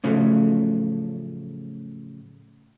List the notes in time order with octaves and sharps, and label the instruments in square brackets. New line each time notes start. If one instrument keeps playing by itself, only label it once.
[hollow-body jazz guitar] A2 C#3 F3 F#3 A3